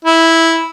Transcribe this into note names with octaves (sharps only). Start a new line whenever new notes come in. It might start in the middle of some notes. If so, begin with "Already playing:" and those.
E4